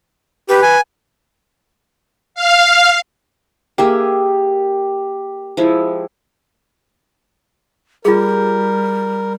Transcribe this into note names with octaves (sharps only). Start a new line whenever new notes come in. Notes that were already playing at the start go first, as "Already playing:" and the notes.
G4 B4
G#5
F5
A#3 G4 G#4 E5
F3 G#3 E4
G3 F4 G#4 A#4